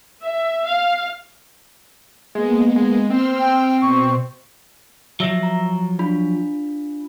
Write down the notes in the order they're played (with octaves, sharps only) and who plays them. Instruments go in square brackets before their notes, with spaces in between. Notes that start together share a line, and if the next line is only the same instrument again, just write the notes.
[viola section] E5
F5
[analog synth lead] G#3 [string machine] A#3 B3
[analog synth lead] G#3
[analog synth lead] C4 [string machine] C6 E6 F6
[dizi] G5
[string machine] B2 [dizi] C#6
[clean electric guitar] F3 F#3 [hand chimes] E5 E6 A#6
[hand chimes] A#5
D4 F4 B5